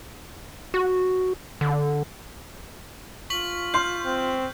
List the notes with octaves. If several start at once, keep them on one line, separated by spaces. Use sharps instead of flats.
F#4
D3
F4 C#6 B6 F#7
C6 F6 G6 C7
C4